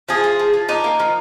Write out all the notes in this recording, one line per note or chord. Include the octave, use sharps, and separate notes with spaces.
F3 G#4
F3
F3
F3
D4 D#4
A#3
F3